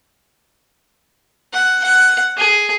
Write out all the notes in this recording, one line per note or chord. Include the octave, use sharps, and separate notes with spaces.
F#5
F#5
G#4